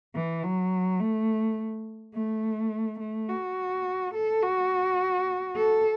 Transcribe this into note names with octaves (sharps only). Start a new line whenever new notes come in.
E3
F#3
A3
A3
A3
F#4
A4
F#4
A4